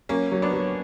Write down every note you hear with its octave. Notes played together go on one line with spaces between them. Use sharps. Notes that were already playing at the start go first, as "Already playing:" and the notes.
F#3 A#3 C#4
F#3
B3 D4
F#3